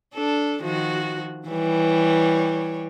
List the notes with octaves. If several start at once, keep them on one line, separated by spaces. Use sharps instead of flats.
D4 A4
D#3 F3 F#4
E3 G3 C#5